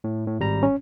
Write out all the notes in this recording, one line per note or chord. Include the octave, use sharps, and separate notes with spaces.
A2
A2
G#1 G3 A#5
C#4